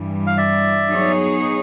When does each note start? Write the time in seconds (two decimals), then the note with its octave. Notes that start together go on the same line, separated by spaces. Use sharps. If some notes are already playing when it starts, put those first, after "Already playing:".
Already playing: G2 E3 G3
0.27 F5
0.37 D5 E5
0.91 F#3 B3 D#4 G#4 C#5